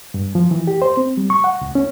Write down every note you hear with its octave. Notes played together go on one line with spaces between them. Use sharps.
G2
F3
E3
G4
C5
C4
G3
C#6
F#5
C#2
C#4